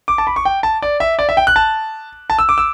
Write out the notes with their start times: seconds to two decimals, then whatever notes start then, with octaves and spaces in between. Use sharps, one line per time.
0.08 D6
0.18 A5
0.27 B5
0.36 C#6
0.45 G5
0.63 A5
0.82 D5
1.00 E5
1.19 D5
1.29 E5
1.37 G5
1.47 F#6
1.56 A5
2.30 A5
2.39 E6
2.49 D6
2.58 E6